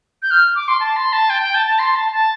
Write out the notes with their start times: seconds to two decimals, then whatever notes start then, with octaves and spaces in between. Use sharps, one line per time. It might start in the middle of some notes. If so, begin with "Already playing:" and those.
0.22 G6
0.31 F6
0.55 D6
0.68 C6
0.80 A5
0.97 C6
1.13 A5
1.30 G5
1.42 G5
1.55 A5
1.66 A5
1.79 C6
1.96 A5
2.12 A5